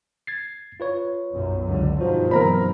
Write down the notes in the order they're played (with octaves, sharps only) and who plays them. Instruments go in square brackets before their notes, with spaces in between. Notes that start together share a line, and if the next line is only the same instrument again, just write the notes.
[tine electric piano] G#6 A6 C7
F4 B4 C#5
[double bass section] B1 F#2
C#2 D3
[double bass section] G2 B2 D#3 [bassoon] F3 [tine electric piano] F#4
[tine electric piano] E3 F#3 A#3 [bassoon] C4 [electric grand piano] A#4 A#5 B5